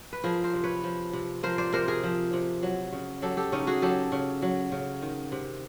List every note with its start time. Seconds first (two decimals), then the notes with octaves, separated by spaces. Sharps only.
0.13 B4
0.24 F3 G#4 A#4
0.44 A#4 C5
0.54 C3
0.64 B4 C#5
0.83 F3
1.13 C3
1.43 F3 A#4 C5
1.58 C5 D5
1.73 C3 A#4 C5
1.88 G#4 A#4
2.03 F3
2.33 C3
2.63 F#3
2.92 C#3
3.22 F#3 G4 A4
3.37 G4 A4
3.52 C#3 C#4 D#4
3.67 F#4 G#4
3.82 F#3 G4 A4
4.12 C#3
4.42 F#3
4.72 C#3
5.02 D#3
5.32 C3